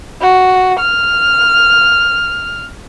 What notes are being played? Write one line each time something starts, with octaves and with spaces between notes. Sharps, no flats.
F#4
F6